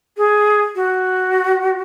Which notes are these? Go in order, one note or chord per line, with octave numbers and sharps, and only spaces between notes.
G#4
F#4